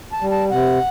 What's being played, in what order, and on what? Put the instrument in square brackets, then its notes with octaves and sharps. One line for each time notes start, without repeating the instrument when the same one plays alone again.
[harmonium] A5
G3
A5
C3 F#5